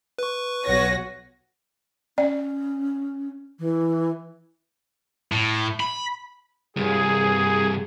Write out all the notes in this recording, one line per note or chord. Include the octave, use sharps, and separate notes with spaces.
B4 C#6
B1 F#4 C#5 A#6
C#4 D5
E3
A2
B5
C2 G2 G#4